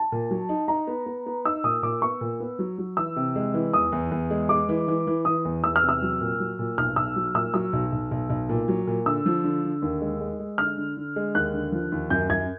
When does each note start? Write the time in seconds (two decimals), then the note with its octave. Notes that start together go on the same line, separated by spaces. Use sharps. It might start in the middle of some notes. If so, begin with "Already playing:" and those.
Already playing: A5
0.12 A#2
0.31 F#3
0.49 D#4
0.68 D#4 A#5
0.87 B3
1.06 B3
1.26 B3
1.45 D#4 E6
1.64 A#2 D#6
1.83 A#2 D6
2.01 B3 C#6
2.21 A#2
2.40 B3
2.59 F#3
2.78 F#3
2.97 E3 E6
3.16 C3
3.36 G#3
3.54 E3
3.73 E2 D#6
3.92 E2
4.11 E2
4.31 G#3
4.49 G#3 D6
4.69 E3
4.88 E3
5.07 E3
5.25 E3 D#6
5.45 E2
5.64 E2 E6
5.76 F6
5.83 C3
5.89 E6
6.02 F#3
6.21 A#2
6.40 F#3
6.59 A#2
6.78 B1 F6
6.96 B1 E6
7.16 F#3
7.35 A#2 E6
7.54 F#3 E6
7.73 B1
7.92 B1
8.11 B1
8.30 B1
8.49 A#2
8.68 F#3
8.87 A#2
9.06 D3 E6
9.26 F3
9.44 D3
9.64 D3
9.82 D#2
10.01 G#3
10.21 G#3
10.40 G#3
10.58 D3 F6
10.78 D3
10.97 D3
11.16 G#3
11.35 D#2 F#6
11.54 D3
11.72 F3
11.92 D#2
12.10 F#2 G6
12.30 F#2 G#6